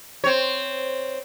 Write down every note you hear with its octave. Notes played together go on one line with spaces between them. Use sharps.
C4 C#5